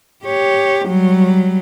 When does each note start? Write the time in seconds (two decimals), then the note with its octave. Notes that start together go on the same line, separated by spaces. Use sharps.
0.25 G4 C#5
0.86 F#3 G3